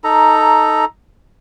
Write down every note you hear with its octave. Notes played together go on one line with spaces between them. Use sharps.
D#4 A4 A#5